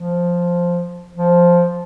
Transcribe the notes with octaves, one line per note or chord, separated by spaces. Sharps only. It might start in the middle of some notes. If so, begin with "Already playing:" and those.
Already playing: F3
F3